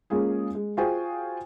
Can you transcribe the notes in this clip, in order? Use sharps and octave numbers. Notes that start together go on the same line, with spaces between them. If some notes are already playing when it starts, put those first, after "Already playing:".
G#3 A#3 C#4 F4 G#4
G#3
F4 F#4 G#4 C5 G5 G#5